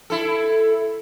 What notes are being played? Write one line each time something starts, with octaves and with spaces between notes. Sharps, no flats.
E4 A4